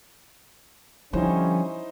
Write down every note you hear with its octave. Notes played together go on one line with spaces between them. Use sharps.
D3 F3 G3 C#4 D#4 E4 C5